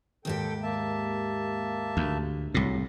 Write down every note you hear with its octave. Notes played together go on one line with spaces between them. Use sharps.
D#2 G#2 G4 A4 G5
A#3 E5 A5
D2
C2 A2 F#3